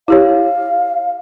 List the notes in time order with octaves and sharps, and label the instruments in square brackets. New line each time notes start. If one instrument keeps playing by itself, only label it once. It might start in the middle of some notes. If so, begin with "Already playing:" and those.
[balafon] E4 G4 C#5 [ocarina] F5